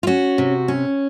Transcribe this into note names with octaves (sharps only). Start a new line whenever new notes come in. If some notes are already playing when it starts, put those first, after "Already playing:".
F4
C#4 F#4
C3
C#4